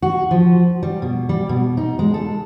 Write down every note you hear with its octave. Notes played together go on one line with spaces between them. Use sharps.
F#4
F3
G3
B2
G3
B2
D#4
G#3
A4